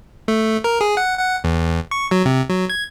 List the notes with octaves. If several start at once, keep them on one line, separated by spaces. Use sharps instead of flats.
A3
A#4
G#4
F#5
F#5
E2
C#6
F#3
C3
F#3
G#6